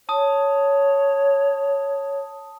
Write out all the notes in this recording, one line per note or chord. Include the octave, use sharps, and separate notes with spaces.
C#5 A5 D#6